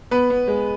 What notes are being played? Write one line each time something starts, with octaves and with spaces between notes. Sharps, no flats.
B3 B4
B3
G#3